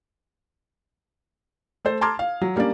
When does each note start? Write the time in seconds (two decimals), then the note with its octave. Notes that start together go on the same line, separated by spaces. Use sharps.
1.85 A3 A4 C5
2.01 A5 A#5 C6 D6 F6 G#6
2.19 F5
2.41 F#3
2.56 G3 A#3 C#4 D4 D5